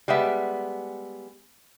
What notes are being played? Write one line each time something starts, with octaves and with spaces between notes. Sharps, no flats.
G3 G#3 B3 E5